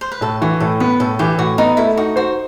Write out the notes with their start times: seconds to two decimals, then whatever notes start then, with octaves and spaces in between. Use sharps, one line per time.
0.01 C5
0.12 B4
0.21 A2 A4
0.42 E3 F#4
0.60 A2 A4
0.80 B3 B4
1.00 A2 A4
1.19 E3 G4
1.38 A2 F#4
1.58 B3 D#4
1.77 A3 E4
1.97 D#4 F#4
2.16 F#4 C5